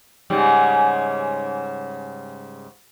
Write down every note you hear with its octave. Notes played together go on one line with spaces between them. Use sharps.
G#2 C#3 G3